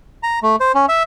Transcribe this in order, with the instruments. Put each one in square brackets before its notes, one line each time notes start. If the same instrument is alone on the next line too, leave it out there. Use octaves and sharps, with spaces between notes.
[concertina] A#5
A3
C5
C#4
E5